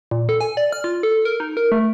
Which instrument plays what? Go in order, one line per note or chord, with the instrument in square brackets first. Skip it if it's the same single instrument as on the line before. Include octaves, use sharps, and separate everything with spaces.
[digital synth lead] A#2
A4
G#5
D5
F6
F4
A4
A#4
D#4
A#4
A3